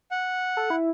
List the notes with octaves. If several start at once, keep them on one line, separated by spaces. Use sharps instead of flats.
F#5
A4
E4